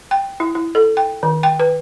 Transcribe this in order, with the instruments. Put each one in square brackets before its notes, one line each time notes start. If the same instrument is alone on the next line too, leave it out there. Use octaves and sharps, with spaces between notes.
[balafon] G5
E4
E4
A4
G5
D#3
G5
B4